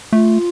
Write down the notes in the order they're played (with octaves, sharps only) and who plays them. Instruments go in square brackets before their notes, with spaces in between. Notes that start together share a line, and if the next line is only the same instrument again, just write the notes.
[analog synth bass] A3 [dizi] F4